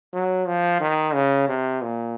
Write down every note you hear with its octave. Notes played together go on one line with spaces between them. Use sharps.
F#3
F3
D#3
C#3
C3
A#2